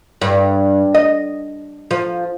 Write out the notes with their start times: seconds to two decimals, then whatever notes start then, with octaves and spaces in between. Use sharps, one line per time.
0.21 G2
0.94 D#5
1.91 F3